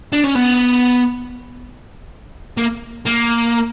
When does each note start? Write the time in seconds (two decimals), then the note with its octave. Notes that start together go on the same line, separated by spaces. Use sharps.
0.12 D4
0.24 C#4
0.35 B3
2.58 A#3
3.06 A#3